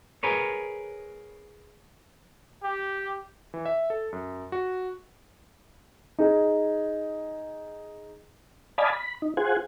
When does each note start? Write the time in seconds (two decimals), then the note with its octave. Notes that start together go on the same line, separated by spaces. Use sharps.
0.23 G#4 A#4 B4 C#5
2.63 G4
3.54 E3
3.66 E5
3.90 A4
4.13 F#2
4.52 F#4
6.18 D#4 G#4
8.78 D5 D#5 F5 G#5 A5 B5
8.93 B5
9.22 D#4
9.37 F4 G#4 C5 F#5 G#5